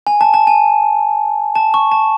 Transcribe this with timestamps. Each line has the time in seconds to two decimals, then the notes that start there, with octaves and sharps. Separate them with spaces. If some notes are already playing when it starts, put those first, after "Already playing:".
0.07 G#5
0.21 A5
0.34 A5
0.47 G#5
1.55 A5
1.74 C#6
1.92 A5